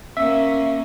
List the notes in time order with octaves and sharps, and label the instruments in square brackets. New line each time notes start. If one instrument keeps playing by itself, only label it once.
[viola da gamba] A#3 C#4 [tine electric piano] E5